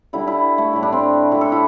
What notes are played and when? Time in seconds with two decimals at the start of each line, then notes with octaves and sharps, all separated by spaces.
0.13 D3 G3 E4
0.27 E4
0.58 A3
0.73 A2 G3
0.83 D4
0.92 C4
1.32 D3 A3 E4
1.41 A4
1.52 E4